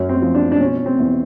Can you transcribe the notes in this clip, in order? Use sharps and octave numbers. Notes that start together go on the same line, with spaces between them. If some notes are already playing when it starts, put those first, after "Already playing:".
Already playing: F#2 C#4
C4
F3
D4
D4
B2 C#4
C4
E2